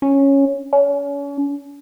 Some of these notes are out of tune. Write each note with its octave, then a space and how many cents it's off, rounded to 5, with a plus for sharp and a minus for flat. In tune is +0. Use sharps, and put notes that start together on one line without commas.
C#4 -5
C#4 +35